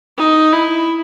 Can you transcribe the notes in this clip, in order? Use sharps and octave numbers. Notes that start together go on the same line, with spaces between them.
D#4
E4